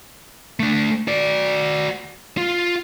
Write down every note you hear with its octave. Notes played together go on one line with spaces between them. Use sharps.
A3 D4
F#4 D5
F4